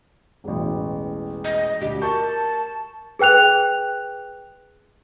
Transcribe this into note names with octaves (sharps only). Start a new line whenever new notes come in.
E1 A1
D#5
D2 G4
A#4 A5 C#6 G6
G#4 B4 G5 F#6 F7